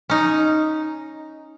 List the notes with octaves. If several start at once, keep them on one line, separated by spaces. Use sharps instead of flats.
C#4 D#4